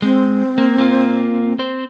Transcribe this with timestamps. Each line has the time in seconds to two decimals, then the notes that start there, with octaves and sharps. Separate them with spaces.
0.02 G#3 C4
0.58 A#3
0.78 A#3 F4
1.59 C4 C5